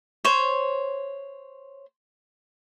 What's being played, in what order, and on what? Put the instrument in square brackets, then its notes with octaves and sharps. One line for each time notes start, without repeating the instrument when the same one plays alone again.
[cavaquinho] C5 C#5